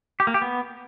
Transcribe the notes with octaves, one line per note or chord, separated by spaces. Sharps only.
G4
A#3
G4
B3